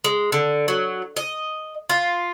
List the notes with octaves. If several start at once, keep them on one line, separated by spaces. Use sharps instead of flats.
G#3
D3
F#3
D#5
F4